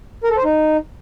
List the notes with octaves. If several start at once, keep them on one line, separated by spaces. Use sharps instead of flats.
A#4
A4
C5
D#4